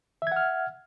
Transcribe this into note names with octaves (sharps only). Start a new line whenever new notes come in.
E5 F#5 F6 G#6